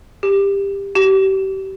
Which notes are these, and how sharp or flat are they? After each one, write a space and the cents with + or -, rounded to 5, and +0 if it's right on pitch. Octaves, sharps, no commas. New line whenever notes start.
G4 +20
G4 -30